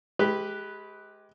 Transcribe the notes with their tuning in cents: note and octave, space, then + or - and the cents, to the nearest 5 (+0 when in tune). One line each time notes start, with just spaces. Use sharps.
G#3 +25 G4 +0 B4 +0